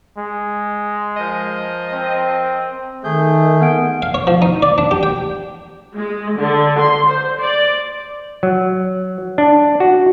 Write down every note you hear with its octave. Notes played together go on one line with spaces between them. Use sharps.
G#3
F3 A#4 D#5
C4
D#3 A3 G#4 G6
B3 F#5 D7
F5
C#5
F3
D#4
D5
D4
G4
G5
G#3
D3
C6
C5
D5
F#3
D4
F#4